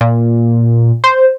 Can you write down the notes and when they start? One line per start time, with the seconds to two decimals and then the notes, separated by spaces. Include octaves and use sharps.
0.01 A#2
1.04 C5